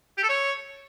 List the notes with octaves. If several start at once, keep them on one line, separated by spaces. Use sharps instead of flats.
G4
A4
C#5